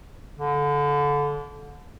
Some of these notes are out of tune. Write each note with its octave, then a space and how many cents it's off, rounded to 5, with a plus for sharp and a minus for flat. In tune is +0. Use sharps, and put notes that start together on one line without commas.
D3 -25